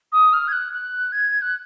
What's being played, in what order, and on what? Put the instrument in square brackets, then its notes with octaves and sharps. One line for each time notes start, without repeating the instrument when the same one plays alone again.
[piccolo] D#6
F6
G#6
F#6
F#6
G#6
F#6